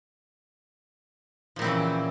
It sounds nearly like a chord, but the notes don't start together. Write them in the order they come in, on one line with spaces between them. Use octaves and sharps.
F3 A#2 C4 E3 C#3